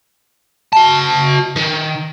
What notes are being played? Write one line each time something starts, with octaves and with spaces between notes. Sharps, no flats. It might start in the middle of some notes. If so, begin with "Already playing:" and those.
F#4 A5
D#3